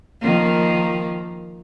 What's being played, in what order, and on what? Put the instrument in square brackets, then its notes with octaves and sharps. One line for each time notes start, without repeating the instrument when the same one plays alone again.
[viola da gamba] D#3 F3 A#3